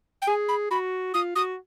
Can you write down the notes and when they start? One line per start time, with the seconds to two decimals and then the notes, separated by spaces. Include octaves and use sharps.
0.22 G5
0.27 G#4 G#5
0.48 B5
0.70 F#4 B5
1.14 F4 D#6
1.36 F#4 D#6